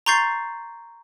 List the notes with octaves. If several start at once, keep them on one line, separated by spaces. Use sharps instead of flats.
A#5 C6 C#6 G6 A6 C7